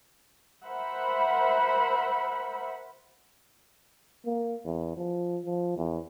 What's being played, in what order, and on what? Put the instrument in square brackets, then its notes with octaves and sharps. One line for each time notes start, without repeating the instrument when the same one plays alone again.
[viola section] A#4 C5 E5 F#5 B5
[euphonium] A#3
E2
F3
F3
E2